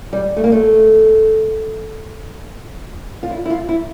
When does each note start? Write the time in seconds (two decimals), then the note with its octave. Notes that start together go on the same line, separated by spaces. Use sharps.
0.13 G3
0.37 A3
0.44 A#3
0.52 A3
3.23 F4
3.31 E4
3.46 E4
3.50 F4
3.69 E4